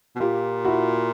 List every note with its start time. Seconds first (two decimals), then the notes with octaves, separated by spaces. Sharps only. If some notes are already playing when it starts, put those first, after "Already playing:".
0.16 B2
0.20 A#2 F4 G4
0.65 E4 F#4